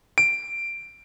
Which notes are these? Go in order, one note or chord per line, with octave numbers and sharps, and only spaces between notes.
D7